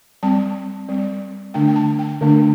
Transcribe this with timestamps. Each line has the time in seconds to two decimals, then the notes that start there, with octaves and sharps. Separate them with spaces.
0.23 G3 C4 A5
0.88 G3 C4
1.54 D3 A3 D4 G5
1.68 G5
1.76 A5
1.99 G5
2.21 D3 A3 D4